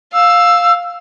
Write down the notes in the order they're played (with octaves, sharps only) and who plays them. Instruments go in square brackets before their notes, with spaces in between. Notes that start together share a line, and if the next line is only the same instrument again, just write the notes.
[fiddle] F5 [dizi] E6